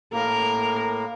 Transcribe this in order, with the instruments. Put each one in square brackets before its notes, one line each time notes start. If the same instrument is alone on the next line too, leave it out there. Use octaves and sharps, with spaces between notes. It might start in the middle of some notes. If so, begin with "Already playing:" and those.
[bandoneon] A2 A#3 [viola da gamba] A#4